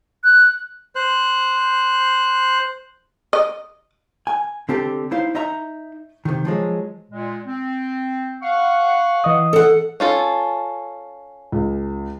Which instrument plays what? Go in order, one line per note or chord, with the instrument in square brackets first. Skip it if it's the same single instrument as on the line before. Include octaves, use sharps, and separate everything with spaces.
[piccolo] F#6
[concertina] C5 F#6
[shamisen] D#5
[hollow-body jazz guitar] G#5
D3 C4 G4 A5
D#4 E4 C5 F5
D#4 D#5 E5 A#5
C3 D#3
F3 F#3 G#3
[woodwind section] A#2 G#3
C4
F5 F#5 C#6
[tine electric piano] E3 D#5 D#6
[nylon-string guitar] A4 F#5
[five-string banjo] C#4 F4 A4
[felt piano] C#2